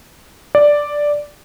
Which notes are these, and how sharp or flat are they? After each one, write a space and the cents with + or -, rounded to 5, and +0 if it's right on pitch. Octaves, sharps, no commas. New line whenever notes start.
D5 +0